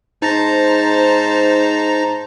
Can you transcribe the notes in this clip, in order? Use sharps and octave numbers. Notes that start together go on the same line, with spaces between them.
G#2 D#4 C5 A5 A#5 A#6